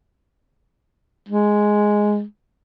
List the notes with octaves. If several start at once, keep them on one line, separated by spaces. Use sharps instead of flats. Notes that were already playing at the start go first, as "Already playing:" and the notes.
G#3